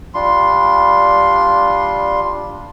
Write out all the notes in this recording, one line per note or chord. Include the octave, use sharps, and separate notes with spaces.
G3 D4 F4 C6